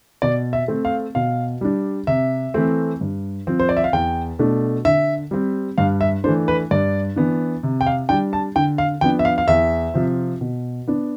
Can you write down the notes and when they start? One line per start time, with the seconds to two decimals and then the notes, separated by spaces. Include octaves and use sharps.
0.22 B2 D5
0.53 E5
0.68 A3 C4
0.85 F5
1.15 B2 F5
1.61 G3 D4
2.07 C3 E5
2.54 E3 A3 C4
3.01 G2
3.47 F3 C4
3.59 C5
3.69 D5
3.77 E5
3.84 F5
3.93 E2 G5
4.39 B2 A3 D4
4.85 D3 E5
5.31 G3 C4
5.78 G2 F5
6.01 E5
6.24 E3 A3 D4 C5
6.48 B4
6.71 G2 D5
7.16 E3 B3 D4
7.63 C3
7.81 G5
7.86 F5
8.09 G3 D4 G5
8.33 A5
8.56 D3 G5
8.78 F5
9.01 F3 B3 D4 G5
9.19 E5
9.25 F5
9.38 F5
9.48 E2 E5
9.94 C3 F3 C4
10.41 B2
10.88 B3 D4